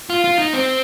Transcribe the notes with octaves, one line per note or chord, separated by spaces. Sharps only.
F4
F4
D#4
C4